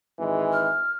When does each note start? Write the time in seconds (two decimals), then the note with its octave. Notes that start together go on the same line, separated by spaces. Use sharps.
0.19 G#1 E3 G#3
0.53 F6